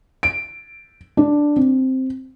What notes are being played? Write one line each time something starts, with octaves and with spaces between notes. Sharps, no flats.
D7
D4
C4